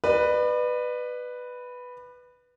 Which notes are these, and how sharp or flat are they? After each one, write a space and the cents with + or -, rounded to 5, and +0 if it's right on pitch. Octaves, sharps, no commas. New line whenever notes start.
B4 +0 D5 +40